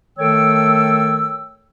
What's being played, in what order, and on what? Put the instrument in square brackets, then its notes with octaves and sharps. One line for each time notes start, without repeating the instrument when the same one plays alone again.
[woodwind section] D#3 A3 A4 C#5 G5 E6